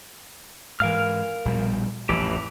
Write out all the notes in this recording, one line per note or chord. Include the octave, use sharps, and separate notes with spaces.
G#2 E3 A#4 F5 F6
A#1 B2 G3
A1 F2 E3 G4